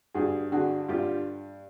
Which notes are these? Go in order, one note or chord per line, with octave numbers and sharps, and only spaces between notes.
G2 F#4 G#4
D3 F#4 G#4
G2 F4 G4